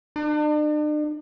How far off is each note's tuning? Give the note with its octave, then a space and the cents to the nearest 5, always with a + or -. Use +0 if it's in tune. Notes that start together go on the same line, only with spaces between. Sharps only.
D4 +45